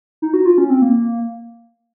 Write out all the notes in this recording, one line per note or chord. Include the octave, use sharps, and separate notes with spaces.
D#4
F#4
F4
C#4
C4
A#3